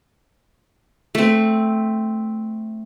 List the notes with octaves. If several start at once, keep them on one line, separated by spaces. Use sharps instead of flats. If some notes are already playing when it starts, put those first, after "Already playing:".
A3 C4